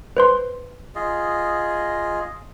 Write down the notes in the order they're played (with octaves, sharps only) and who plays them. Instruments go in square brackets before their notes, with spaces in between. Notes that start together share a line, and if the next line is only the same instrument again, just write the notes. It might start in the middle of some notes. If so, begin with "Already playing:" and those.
[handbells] B4 C5 C6
[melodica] F4 G#4 D#5